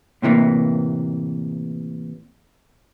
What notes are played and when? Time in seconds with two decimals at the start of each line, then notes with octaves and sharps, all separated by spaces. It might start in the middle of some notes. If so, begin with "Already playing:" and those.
0.22 A2 C3 E3 G3 A#3